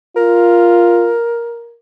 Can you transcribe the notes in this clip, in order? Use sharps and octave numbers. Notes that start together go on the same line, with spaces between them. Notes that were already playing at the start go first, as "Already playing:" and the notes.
F4 A#4